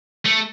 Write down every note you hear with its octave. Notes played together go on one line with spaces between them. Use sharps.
A3